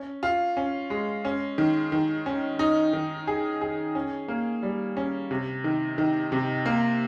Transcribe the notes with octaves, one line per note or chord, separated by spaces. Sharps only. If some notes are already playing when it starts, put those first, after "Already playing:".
Already playing: C#4
F4
C#4
G#3
C#4
D#3
D#3
C#4
D#4
D#3
G#4
G#4
C#4
A#3
G3
C#4
C3
D#3
D#3
C3
A#3